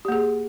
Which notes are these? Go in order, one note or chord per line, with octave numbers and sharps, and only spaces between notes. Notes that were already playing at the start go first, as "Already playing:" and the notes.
A#3 G4 G#4